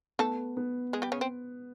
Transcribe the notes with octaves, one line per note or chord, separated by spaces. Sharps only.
A3 B3 A4
B3
G#3 G#4
G3 G4
C#3 C#4
C4